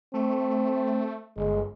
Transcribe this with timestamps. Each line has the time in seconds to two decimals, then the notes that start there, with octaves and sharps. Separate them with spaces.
0.14 A3 C4
1.37 G1 G#3